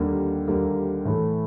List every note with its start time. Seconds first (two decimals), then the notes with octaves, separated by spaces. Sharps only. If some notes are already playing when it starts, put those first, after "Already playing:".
Already playing: D#2 D3 G3 A#3
0.48 D#2 D3 G3 A#3
1.05 A2 E3 A3